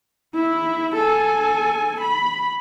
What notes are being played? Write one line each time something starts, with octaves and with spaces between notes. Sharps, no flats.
E4
A4 G#5
B5